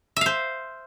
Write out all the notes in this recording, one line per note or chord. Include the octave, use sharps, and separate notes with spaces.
C5 E5 F5